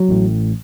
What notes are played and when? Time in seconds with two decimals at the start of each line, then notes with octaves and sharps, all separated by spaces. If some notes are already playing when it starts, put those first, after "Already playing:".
Already playing: F#3
0.09 A1 A2